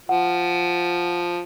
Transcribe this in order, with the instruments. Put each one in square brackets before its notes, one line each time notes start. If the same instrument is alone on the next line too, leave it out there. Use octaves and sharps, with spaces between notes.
[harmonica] F3 [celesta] F#5